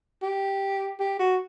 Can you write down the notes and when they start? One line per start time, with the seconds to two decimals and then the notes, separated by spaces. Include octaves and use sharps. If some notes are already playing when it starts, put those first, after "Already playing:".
0.22 G4
1.00 G4
1.19 F#4